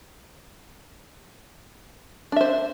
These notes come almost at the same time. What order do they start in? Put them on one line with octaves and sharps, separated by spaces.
D4 E5 C5